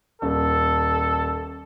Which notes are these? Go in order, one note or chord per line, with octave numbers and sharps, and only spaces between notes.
D#1 A4